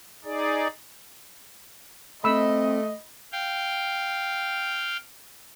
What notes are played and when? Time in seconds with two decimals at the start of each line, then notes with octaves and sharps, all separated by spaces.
0.25 D#4 G#4 D5
2.24 A3 C4 D#5 B5 E6
3.32 F5 G5